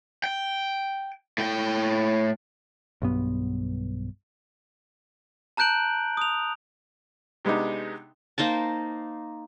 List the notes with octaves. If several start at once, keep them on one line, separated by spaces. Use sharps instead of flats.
G5
A2 G5
B1 G2 B3
A5 A#5 F#6 G6 D7 F#7
D#6 F7
C3 G#3 B3 D4 D#4
A#3 D#4 C5 A5